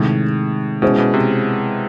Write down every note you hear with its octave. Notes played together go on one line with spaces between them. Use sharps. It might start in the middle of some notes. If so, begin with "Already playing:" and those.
Already playing: A2 C3 D#3 G#3
B2 G#3 C#4 E4 G#4 C5
B2
C3